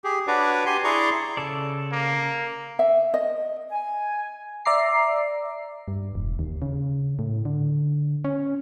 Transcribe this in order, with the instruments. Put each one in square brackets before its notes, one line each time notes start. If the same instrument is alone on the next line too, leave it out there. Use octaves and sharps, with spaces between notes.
[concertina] G4 G#4
D4 F#4 B4 C#5 D5
G4 G#5 C6
E4 G#4 D5 A#5 C6 C#6
[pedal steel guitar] C#3 A4 D5
[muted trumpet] A#3
[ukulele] E5
D#5
[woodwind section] G#5
[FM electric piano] D5 E5 A#5 D6 C7
[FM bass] G2
E1
D#2
C#3
A2
D3
C#4